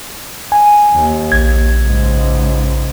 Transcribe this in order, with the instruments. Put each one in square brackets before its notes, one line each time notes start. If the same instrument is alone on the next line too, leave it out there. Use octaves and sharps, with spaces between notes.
[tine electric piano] G#5
[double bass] D#2
[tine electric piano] A#1 G#6
[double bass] C#2 G#2